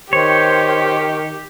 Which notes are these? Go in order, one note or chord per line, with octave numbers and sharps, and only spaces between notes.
D#3 G4 C5 C#5